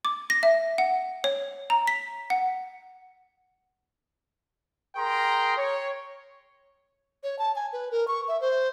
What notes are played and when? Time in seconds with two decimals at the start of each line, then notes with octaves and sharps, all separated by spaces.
0.05 D6
0.30 A#6
0.43 E5
0.78 F#5
1.24 C#5
1.70 A#5
1.87 B6
2.30 F#5
4.96 G#4 A#4 G5 A#5 C6
5.56 C#5
7.23 C#5
7.39 A5
7.56 G#5
7.73 B4
7.91 A#4
8.08 C#6
8.28 E5
8.41 C5